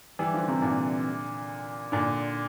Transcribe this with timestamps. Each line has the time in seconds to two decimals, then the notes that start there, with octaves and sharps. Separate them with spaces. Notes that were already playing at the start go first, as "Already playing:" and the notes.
0.19 E3 G3
0.34 D3 F3
0.48 C3 E3
0.62 A#2 D3
1.92 A#2 D3